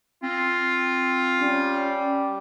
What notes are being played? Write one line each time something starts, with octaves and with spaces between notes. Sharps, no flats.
C4 F4
G3 C#4